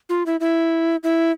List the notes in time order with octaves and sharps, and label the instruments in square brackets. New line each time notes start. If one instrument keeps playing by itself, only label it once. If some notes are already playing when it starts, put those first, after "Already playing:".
[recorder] F4
E4
E4
E4